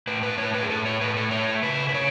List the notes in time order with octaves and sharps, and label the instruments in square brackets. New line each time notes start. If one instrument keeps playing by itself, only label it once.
[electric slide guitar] A2 B4
B4
A2 C#5
B4
G#4
A2 A4
C#5
A2 B4
A4
A3 C#5
C#3 B4
B4
C#3 C#5